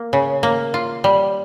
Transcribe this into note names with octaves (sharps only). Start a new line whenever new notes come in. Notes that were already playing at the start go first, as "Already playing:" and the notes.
Already playing: A#3
C#3
A#3
F4
G3